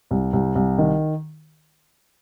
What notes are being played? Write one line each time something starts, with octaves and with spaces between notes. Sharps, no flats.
C2
C2
C2
D#3